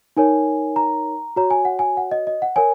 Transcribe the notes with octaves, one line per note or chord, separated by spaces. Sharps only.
D#4 A#4 C#5 G#5
A#5
F#4 C#5 A#5
G#5
F#5
G#5
F#5
D#5
D#5
F#5
A#4 C#5 G#5